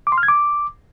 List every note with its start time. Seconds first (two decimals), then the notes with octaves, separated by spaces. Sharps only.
0.07 D6
0.12 C6
0.18 F6
0.23 G#6
0.28 D6